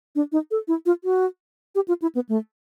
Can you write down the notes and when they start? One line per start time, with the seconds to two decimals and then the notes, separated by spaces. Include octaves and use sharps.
0.15 D4
0.32 D#4
0.51 A4
0.68 E4
0.86 F4
1.04 F#4
1.75 G4
1.88 F4
2.02 E4
2.15 B3
2.29 A3